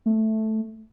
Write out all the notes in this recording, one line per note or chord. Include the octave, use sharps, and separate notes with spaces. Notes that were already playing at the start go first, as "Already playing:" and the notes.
A3